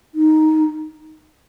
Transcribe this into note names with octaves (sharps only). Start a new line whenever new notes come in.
D#4